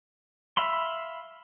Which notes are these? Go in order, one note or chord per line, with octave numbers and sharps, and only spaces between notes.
E5 F5 B5 C6